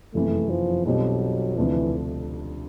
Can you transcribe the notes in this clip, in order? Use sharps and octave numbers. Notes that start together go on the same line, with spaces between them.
F#1 F2 C3 E3 A3
F3
B1 B2 F#3 G3 C4 F4
D2 C3 E3 F3 A3 D4